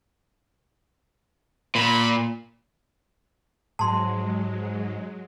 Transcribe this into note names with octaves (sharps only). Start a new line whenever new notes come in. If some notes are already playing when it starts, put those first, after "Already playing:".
A#2 B5
G#2 F#3 G#3 A5 C6